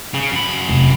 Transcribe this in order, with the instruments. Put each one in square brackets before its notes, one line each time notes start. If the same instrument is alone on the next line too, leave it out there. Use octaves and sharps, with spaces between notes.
[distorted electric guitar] C#3
F#2 B5
[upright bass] F1